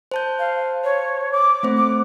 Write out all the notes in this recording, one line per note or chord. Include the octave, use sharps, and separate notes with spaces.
C5 A5 G6
F5
C#5
D6
A3 C4 C5
D6